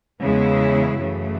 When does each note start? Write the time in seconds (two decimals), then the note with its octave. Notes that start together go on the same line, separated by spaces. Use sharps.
0.22 E2 C#3 G#3 B3 E4
0.97 F#2 C#3 E3 A3